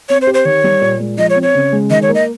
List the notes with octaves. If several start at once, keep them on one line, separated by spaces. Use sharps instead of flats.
C4 C#5
C5
G4
C5
D#3 C#5
G3
A#2
G#3
F3 D#5
C#5
C4
C#5
C#3
G#3
D#3 D#5
C#5
A#3
D#5